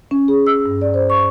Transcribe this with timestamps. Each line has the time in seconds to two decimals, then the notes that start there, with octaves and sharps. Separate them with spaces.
0.11 C#4
0.28 G#4
0.47 E6
0.66 G2
0.81 D5
0.94 C5
1.10 C#6